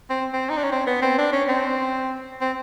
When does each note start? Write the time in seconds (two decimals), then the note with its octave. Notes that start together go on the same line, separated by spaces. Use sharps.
0.10 C4
0.33 C4
0.50 D#4
0.57 D4
0.64 C#4
0.72 C4
0.87 B3
1.02 C4
1.18 D4
1.33 C#4
1.48 C4
2.41 C4